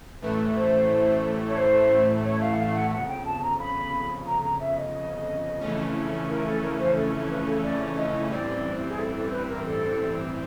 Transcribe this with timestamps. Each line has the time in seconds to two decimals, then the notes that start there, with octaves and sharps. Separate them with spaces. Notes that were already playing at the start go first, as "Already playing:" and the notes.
0.22 A1 A2 E3 A3 B4
0.56 C5
1.49 C#5
1.57 C5
2.25 C#5
2.41 F5
2.54 F#5
2.58 F5
2.75 F#5
2.92 G1 F2 C#3 F#5
3.08 G5
3.25 A5
3.42 A#5
3.59 B5
4.27 A#5
4.43 A#5
4.60 E5
4.77 D#5
5.61 F2 C#3 E3 A3 C#4
6.29 A#4
6.45 A4
6.62 A#4
6.79 C5
6.96 A4
7.29 B4
7.46 A4
7.63 D5
7.97 D#5
8.30 A1 G2 E3 G3 C4 D5
8.89 G#4
8.98 A4
9.15 A4
9.32 B4
9.48 A#4
9.65 A4